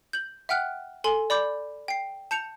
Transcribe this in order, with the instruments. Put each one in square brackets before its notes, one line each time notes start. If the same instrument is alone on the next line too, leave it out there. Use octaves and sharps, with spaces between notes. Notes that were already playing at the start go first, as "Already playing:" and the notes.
[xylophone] G6 F#7
E5 F#5 G5 F6 F#6
A4 G#5 C6 F#7
D5 B5 D6 G6
G5 C7
A5 G6 C#7 F7